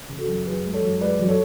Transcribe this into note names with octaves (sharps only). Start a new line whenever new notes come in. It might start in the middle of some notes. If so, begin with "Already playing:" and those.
C#3
F#4 A4
F#2
F#2 G#4 B4
G#3
A4 C#5
F#2
G#3 B4 D5
F#2
A4 C#5